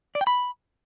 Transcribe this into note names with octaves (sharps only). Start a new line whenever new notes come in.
D5
G5
B5